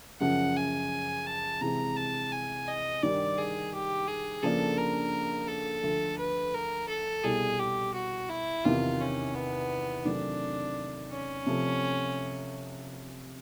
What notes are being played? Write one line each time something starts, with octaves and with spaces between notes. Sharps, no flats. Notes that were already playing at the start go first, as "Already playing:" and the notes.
F#2 C#3 F3 F#5
G#5
A5
C3 E3 G#3 C4 A#5
A5
G#5
D#5
G2 D#3 G3 D5
G#4
G4
G#4
C#3 F3 A#3 D4 A4
A#4
A4
D2 D3 F3 A3
B4
A#4
A4
C2 B2 G3 G#4
G4
F#4
E4
E2 C3 D#3 F4
C#4
B3
C3 D#3 F#3 A3 C4 D4
C#4
C3 F3 A3